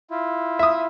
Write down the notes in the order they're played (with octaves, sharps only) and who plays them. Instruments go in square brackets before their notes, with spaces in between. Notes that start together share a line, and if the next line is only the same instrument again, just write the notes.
[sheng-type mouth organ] E4 F4
[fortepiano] E5 D#6